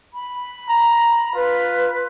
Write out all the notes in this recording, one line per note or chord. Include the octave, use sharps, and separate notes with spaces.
B5
A#5
F4 B4